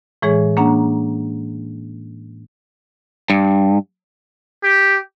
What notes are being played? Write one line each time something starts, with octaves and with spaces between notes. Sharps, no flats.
A2 E3 G#3 G#4 C#5
A#3 C#4 D4 F#5 A#5
G2
G4